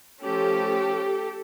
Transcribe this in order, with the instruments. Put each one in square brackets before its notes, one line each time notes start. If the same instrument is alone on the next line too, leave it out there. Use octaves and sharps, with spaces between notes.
[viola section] F3 A3 C#4 G4 A4